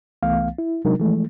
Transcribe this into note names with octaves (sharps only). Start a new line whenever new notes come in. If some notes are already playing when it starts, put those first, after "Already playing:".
C2 E3 A3 B3 F5
E4
C3 F#3 G#3 D4 D#4 A#4
E3 F3 G#3 A3